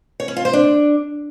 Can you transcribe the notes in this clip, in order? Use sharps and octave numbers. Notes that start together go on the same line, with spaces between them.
C#5
C#4
F4
C5
D4